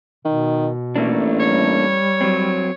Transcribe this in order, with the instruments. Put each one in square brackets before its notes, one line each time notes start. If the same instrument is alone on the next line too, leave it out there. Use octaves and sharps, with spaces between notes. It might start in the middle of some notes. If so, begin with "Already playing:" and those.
[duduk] B2 [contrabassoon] D#3
[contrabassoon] A1 [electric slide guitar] A3 A#3 D4
[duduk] G3 [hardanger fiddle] C#5
[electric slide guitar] F#3 C4